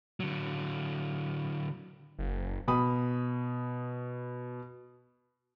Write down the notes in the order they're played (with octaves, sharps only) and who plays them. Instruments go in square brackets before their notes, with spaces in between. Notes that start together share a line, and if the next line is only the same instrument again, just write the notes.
[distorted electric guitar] D3 F#3
[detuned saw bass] F#1
[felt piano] B2 B5 D#6